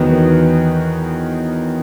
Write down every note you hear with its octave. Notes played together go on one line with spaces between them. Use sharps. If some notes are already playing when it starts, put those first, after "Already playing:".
Already playing: E2 D#3 F#3 B3